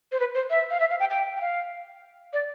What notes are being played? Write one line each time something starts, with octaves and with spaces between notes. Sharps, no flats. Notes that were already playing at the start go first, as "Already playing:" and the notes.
C5
B4
C5
E5
F5
E5
F5
G5
G5
G5
F5
D5